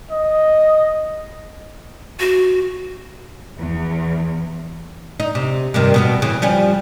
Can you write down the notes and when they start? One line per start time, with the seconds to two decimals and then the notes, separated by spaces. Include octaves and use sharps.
0.11 D#5
2.20 F#4
3.57 E2
5.20 D#4
5.35 C3
5.74 G2 C3 D#3
5.94 B2 A#3 B3
6.22 C#3 E3
6.42 F3 G3 C#4